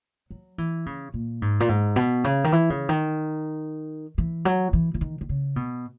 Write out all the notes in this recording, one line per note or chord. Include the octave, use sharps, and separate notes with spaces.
F#3
E3
C#3
A#2
G#2
A#2
G#2
B2
C#3
D#3
E3
C#3
D#3
E3
F#3
E3
E3
D#3
D#3
C#3
B2